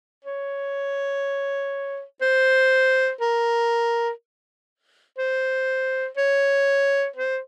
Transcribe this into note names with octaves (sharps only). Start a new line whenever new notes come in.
C#5
C5
A#4
C5
C#5
C5